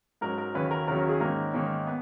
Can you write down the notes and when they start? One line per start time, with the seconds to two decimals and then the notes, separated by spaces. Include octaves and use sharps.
0.21 G#2 F#3 C#4 A#4
0.38 A#4
0.55 D#2 C#3 F#3 C#4 B4
0.71 A#4
0.88 D#2 C#3 F#3 C#4 A#4
0.99 A#4
1.09 G#4
1.20 G#2 D#3 A#3 C#4 A#4
1.54 G#2 D#3 A#3 C#4
1.87 B3